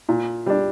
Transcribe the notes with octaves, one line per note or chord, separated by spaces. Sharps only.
A#2
G3 D4